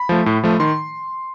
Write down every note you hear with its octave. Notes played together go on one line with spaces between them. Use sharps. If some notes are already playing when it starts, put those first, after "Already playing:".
Already playing: B5
F3 A3
A2
F3 A3
D#3 C6